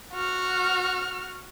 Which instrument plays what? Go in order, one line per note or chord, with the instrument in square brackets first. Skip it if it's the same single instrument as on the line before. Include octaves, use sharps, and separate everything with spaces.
[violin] F#4 F6